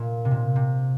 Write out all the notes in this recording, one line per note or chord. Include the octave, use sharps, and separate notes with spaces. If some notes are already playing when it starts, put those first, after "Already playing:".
Already playing: A#2
C3
A#2
C3